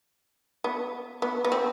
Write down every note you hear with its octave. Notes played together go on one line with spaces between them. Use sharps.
B3
B3
B3
C4